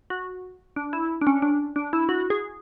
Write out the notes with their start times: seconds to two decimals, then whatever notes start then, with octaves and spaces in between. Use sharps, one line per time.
0.10 F#4
0.76 D4
0.93 E4
1.21 D4
1.27 C#4
1.42 D4
1.76 D4
1.93 E4
2.09 F#4
2.30 G#4